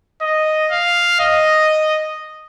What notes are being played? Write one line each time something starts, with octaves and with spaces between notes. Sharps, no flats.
D#5
F5
D#5